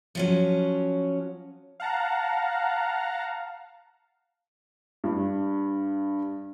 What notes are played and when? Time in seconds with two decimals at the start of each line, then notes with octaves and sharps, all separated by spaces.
0.15 F3 F#3 C#4
1.80 F5 F#5 A5 A#5
5.04 G2